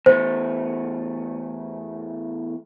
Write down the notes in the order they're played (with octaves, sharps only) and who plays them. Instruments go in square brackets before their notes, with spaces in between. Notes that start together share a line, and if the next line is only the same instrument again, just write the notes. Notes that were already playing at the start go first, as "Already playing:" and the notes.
[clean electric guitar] E2 A3 [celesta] C5